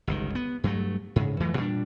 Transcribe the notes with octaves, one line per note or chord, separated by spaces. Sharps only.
G1 C#2 D#3
B3
G2 F#3 A3
G#2 C#3
F2 E3 F#3 A3
A#2 G3 D4